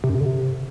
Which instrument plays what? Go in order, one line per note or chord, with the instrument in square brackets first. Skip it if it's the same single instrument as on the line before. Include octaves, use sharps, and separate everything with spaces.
[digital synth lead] C3
F#2
C3
D3
C3